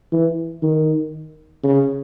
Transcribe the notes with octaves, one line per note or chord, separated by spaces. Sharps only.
E3
D#3
C#3